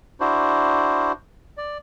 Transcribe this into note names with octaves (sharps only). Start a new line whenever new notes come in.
D4 E4 F#4 C5
D5